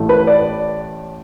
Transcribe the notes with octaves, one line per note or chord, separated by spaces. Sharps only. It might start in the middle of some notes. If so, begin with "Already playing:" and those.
Already playing: A1 A2 A3
B4
D5